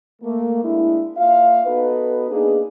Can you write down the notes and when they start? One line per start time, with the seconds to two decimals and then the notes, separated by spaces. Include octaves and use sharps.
0.22 A3 A#3
0.62 G#3 A#3 D4 E4
1.17 A#3 F4 E5 F5
1.65 B3 D#4 F#4 A4 B4
2.30 A#3 B3 D4 D#4 G#4